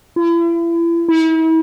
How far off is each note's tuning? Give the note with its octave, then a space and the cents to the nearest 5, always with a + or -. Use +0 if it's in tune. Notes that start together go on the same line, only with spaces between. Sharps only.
E4 +35
E4 -40